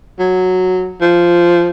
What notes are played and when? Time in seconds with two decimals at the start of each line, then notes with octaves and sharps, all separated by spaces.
0.19 F#3
1.01 F3